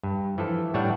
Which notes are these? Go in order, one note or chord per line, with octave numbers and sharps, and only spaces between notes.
G2
E3 F3 A4
A2 G3 D4 C#5 E5 F#5